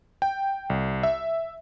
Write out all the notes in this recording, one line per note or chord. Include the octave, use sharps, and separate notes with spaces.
G5
C2
E5